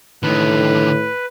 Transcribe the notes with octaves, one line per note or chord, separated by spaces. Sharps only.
A2 D3 D#3 B4